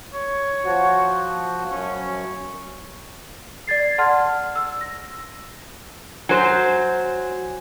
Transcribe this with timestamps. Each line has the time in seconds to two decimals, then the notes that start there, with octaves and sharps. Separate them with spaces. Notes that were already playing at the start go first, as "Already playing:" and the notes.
0.14 C#5
0.65 F3 F#4
1.71 F#2 C#4
3.67 D5 G#6 A6 C7
3.98 D5 F#5 A5 C6 F6
4.55 E6
4.81 A#6
6.29 F#3 F#4 C5 G#5